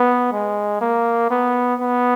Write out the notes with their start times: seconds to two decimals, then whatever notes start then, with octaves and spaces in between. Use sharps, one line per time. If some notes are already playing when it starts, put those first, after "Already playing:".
Already playing: B3
0.32 G#3
0.81 A#3
1.30 B3
1.80 B3